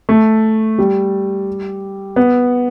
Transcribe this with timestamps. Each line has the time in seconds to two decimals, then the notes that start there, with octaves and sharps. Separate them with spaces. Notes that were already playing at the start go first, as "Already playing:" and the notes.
0.09 A3
0.79 G3
2.16 B3